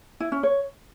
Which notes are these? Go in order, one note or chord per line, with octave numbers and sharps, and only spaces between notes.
E4
C#4
C#5